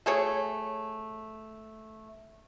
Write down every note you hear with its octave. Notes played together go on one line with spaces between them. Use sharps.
A3 G#4 C#5